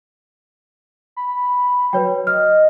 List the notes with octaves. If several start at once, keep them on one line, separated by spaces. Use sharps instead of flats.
B5
F#3 B4 C#5 G5
D#5 F6